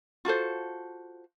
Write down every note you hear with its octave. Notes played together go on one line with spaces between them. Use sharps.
F4 F#4 A4 C5